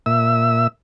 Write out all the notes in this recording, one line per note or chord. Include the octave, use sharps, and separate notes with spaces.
A#2 E5 E6